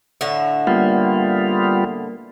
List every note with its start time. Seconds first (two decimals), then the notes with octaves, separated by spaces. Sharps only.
0.21 A2 D3 E5
0.67 G3 A#3 B3 F4